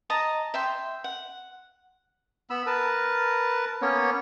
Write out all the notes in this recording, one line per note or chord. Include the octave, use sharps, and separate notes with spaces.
D#5 A5 A#5
E5 G5 C6
F#5
B3 B5 E6
A#4 B4 A5
A#3 B3 C#4 C#5